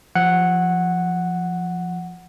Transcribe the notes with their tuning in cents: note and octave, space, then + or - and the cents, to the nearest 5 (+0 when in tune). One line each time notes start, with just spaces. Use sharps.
F3 +0 F#5 +0